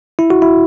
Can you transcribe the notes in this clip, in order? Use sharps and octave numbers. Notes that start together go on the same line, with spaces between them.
E4
F#4
E4